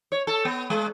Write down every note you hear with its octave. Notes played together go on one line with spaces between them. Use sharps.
C#5
A4
B3
G#3